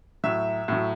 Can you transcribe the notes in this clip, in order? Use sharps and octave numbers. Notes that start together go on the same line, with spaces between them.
A2 F#3 E5
A2 F#3